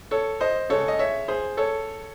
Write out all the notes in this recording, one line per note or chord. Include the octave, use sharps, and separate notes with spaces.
A4 C#5
C5 D#5
C#3 G#3 A4 C#5
D#5
C#5 E5
G#4 C5
A4 C#5